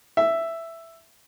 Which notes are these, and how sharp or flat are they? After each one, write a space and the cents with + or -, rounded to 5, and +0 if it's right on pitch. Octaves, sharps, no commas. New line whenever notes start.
E5 +5